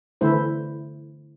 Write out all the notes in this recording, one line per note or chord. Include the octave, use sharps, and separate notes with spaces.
D3 E3 A3 E4 C5